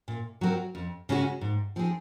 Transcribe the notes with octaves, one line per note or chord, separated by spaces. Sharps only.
A#2
F#3 C4 F#4 A#4
F2
C#3 G#3 C#4 F#4
G#2
F3 C4 D#4 G#4